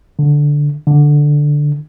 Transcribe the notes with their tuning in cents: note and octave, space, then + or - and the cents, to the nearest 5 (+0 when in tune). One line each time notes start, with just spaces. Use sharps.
D3 -5
D3 +0